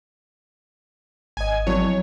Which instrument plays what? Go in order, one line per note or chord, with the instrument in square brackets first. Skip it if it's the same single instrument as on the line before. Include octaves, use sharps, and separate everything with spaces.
[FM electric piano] G#1 D#5 [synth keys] G#5
[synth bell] F3 C4 E4 [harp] F#3 [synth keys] C#5